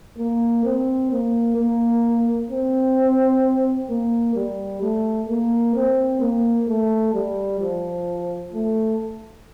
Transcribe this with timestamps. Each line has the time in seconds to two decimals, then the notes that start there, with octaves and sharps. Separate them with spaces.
0.18 A#3
0.65 C4
1.11 A#3
1.57 A#3
2.51 C4
3.90 A#3
4.35 G3
4.82 A3
5.29 A#3
5.75 C4
6.21 A#3
6.68 A3
7.14 G3
7.61 F3
8.53 A3